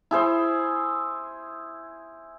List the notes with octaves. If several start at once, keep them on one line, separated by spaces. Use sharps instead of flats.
E4 G#4 C5